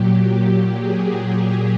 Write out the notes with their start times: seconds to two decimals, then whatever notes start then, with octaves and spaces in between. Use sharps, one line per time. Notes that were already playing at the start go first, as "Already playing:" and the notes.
Already playing: A#2 F#3 G4
0.72 G#4